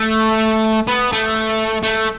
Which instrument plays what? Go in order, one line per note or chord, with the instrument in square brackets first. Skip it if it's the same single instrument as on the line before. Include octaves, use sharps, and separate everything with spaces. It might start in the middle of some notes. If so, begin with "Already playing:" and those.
Already playing: [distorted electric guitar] A3
B3
A3
A3